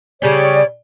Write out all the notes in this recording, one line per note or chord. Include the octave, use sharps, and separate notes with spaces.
C#3 G3 C#4 C#5 D5